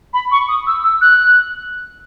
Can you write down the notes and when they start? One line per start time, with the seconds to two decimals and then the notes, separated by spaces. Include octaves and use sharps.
0.13 B5
0.31 C#6
0.48 D#6
0.67 E6
0.84 E6
1.01 F#6